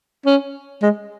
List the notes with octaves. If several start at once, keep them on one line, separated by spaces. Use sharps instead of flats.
C#4
G#3